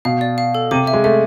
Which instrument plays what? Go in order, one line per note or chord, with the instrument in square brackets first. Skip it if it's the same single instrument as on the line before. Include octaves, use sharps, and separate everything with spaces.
[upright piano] B2 [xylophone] F5
[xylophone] D5
F5
A4
[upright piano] C3 [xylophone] D6
[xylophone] E5
[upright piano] G#3
[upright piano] A3 [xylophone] E5